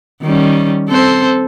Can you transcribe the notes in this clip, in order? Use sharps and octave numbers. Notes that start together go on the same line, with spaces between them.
D#3 G3 C#4
C4 A4 C5